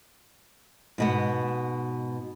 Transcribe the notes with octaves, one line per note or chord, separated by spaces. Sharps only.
G#2 B2 B3